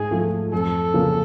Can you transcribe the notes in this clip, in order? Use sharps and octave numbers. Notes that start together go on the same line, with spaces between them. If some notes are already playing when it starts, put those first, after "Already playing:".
Already playing: G#2 G#4
F3 A3
F2 A4
C#3 F3 A#3 C#4